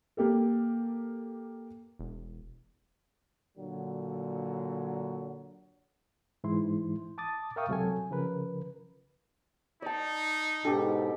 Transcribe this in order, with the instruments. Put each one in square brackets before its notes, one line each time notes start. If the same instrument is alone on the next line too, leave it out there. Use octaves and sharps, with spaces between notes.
[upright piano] A#3 G4 A4
[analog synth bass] E1
[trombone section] A#2 D3 F#3
[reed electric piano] G#2 E3 E4 C6
A5 D6 D#6 A6
A#4 E5 F5 G5 C#6 D#6
C#2 C3 F#3 A4 G#5
C#3 F3 A#4 B4
[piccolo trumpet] D#4 [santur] D5 A5
[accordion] G#2 B2 [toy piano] D4 [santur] G4 A4